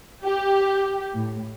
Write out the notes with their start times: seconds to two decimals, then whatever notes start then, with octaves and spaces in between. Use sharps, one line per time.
0.24 G4
1.15 A2